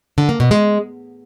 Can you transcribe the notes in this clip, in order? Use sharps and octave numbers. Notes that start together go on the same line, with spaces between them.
D3
A#3
B2
G#3